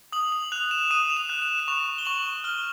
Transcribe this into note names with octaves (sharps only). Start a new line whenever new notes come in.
D#6 F#7
F#7
F#6 F7
E7
D#6 D#7
F7
E7
F#6
E7
E7
C#6 F7
G7
C#6 F#7
F6 G7